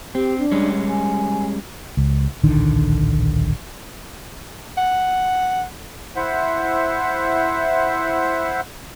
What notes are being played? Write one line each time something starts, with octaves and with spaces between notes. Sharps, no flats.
C4 G4
D4
G3 G#3 C#4
G#5
C#2
D1 A#1 D3 D#3
F#5
E4 C5 E5 F#5